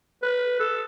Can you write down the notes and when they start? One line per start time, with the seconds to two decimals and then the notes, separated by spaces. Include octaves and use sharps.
0.23 B4
0.60 A4